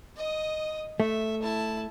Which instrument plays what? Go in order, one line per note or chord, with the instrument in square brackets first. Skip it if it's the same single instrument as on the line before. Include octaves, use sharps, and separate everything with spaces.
[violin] D#5 D#6
[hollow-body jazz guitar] A3 [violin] E5
[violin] E4 A5